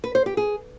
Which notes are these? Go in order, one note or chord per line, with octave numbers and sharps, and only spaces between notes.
B4
C5
G4
G#4